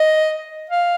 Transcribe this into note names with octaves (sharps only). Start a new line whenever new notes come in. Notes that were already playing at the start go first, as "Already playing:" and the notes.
Already playing: D#5
F5